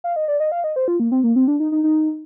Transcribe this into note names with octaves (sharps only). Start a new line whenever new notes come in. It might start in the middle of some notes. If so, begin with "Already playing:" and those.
F5
D#5
D5
D#5
F5
D#5
C5
F4
A#3
C4
A#3
C4
D4
D#4
D#4
D#4